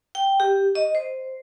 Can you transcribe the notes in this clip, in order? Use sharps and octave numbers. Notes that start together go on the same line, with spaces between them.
G5
G4
D#5
C5